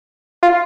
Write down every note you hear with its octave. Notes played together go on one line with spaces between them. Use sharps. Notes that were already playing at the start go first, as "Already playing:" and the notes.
F4